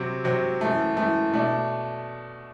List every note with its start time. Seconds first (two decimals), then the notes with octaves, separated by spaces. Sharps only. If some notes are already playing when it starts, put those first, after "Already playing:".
Already playing: C3 F#3 C4
0.24 C3 F#3 C4
0.61 F#2 E3 A3
0.97 F#2 E3 A3
1.34 B2 A3 D4